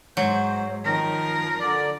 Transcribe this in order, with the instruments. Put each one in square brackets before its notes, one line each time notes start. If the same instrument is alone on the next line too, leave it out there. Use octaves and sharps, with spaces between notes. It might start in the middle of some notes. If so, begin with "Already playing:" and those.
[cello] G#2 [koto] F#3 [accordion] C5
[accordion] D#3 [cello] F3 A#4
[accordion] D3 D5